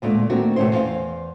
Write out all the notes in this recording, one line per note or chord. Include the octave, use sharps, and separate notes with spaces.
D2 A#2 G#3 A3 D4
D#3 A3 A#3 C4 D4 F#4
B2 D#3 A3 C#4 E4 C5
E2 C5 F5